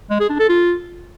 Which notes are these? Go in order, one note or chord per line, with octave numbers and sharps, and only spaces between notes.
G#3
G#4
D4
A4
F4